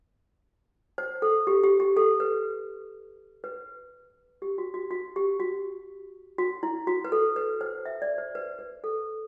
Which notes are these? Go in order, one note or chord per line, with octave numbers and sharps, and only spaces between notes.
C5
A4
G4
G4
G4
A4
B4
B4
G4
F#4
F#4
F#4
G4
F#4
F#4
E4
F#4
B4
A4
B4
C5
E5
D5
C5
B4
B4
A4